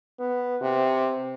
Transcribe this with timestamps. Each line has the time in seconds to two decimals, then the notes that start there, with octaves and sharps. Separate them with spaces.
0.19 B3
0.62 C3